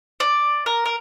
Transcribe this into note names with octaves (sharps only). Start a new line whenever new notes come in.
D5
A#4
A#4